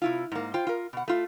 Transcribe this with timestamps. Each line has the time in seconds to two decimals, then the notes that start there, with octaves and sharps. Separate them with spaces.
0.02 C3 E4 F4
0.32 G#2 A#3
0.54 F4 C5 G5
0.67 F4 A#4
0.93 B2 F#5
1.08 A3 F4